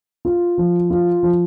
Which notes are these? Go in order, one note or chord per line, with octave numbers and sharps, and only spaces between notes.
F4
F3
F4
F3